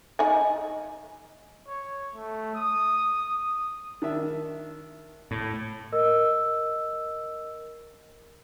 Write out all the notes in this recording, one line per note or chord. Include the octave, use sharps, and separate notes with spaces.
D#4 G#5
C#5
A3
D#6
D#6
D#3 D4 E5
A2
A#4 D#5 E6